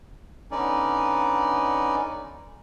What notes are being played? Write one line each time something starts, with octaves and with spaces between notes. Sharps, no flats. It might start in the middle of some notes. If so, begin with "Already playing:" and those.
D3 B3 C#4 D#4 D5